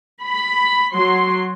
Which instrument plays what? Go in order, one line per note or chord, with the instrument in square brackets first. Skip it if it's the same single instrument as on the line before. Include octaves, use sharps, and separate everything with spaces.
[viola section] B5
F#3 C6